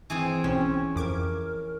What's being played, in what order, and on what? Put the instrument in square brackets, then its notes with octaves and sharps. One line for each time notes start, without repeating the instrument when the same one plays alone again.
[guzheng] E3 G#4 C5 [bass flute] C4
[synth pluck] B1 E6 [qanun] C#4
[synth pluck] F2 D6 G#6 [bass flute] A#4